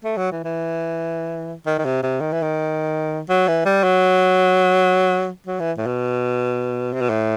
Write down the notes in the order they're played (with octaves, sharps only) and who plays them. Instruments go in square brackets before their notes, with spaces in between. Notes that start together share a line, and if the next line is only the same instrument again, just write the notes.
[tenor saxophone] A3
F#3
E3
E3
D#3
D#3
C3
C3
D#3
E3
D#3
F#3
E3
G3
F#3
F#3
E3
A2
B2
C3
B2
A2